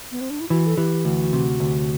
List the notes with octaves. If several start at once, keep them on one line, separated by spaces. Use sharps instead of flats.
B3
C4
D4
E4
E3 F#4
A4
E3 G4
D2 F#4
C3
D2